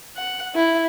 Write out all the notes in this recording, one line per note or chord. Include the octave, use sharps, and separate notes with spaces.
F#5
E4